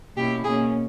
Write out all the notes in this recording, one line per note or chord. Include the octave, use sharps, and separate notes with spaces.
B2 A#3 C#4 E4 G4
B2 A#3 C#4 G#4